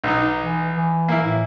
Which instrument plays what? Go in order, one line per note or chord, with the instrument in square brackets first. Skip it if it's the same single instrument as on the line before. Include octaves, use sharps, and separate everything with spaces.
[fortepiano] B1 D#4
[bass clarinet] E3
E3
[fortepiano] A#3 E4
[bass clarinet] A2